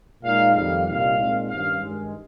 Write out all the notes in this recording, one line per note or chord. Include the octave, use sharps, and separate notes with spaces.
A#2 G#3 D#4 F5
F2 D#3 G3 F5
C2 A#2 G3 C4 D#4 F5
A#2 G#3 C4 D#4
G2 D#3 G3 C#4 F5
G2 D#3 G#3